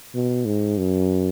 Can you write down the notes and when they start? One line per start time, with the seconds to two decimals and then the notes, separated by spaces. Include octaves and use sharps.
0.14 B2
0.45 G#2
0.78 F#2